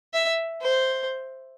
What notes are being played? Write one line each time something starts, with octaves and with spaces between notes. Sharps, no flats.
E5
C5